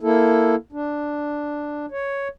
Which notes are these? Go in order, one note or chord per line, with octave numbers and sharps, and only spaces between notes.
A#3 E4 A4
D4
C#5